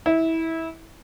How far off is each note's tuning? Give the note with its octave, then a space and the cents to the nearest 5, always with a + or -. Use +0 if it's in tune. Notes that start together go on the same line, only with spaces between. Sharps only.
E4 -20